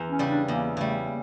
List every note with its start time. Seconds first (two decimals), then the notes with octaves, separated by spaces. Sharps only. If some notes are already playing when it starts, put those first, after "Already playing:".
Already playing: E2
0.10 C#4
0.19 C#3 G3
0.29 D4
0.48 E2 A#3
0.77 C#3 G3 A3
1.06 A#3